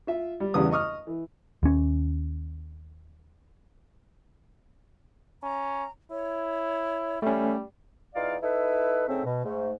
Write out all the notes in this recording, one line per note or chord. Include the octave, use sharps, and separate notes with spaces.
F4 E5
G3
A1 E2 C#3 G3 B4 D#6
D#5 C#6 D#6 F6
E3
D#2 C#4
C#4 A#5
E4 C#5
G3 A3 C#4 E5
E2 D#4 F4 D5 F5
D#4 E4 A4 B4
G#2 C#3 A3 C4
B2
G#2 A3